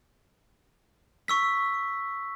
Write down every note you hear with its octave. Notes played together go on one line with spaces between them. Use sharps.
C#6 E6 B6